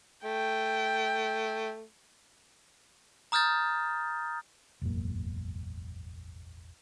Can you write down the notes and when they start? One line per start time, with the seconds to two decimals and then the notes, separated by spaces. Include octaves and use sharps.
0.24 A3 G5
3.32 A#5 D#6 F6 G6 A6
4.81 E1 A1 F#2 A#3